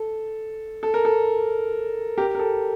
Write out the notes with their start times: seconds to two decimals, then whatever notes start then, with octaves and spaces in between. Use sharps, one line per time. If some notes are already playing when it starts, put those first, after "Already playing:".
Already playing: A4
0.83 A4
0.94 A#4
1.05 A4
2.18 G4 A#4
2.35 A#4
2.39 A4